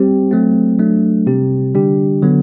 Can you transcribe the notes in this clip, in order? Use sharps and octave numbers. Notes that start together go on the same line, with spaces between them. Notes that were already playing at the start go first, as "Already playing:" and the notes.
Already playing: G3 C4 G4
F#3 A3 C4
F#3 A3 D4
C3 G3 C4 G4
D3 G3 D4 G4
D3 F#3 B3